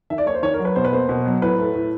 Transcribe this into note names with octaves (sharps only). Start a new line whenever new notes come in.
D#3 E5
D5
A#3 C#5
C5
D#3 C#5
A#4
F#3
B4
B2 C5
B4
A#3 C5
B2
F#3
A2 B4
A3
A2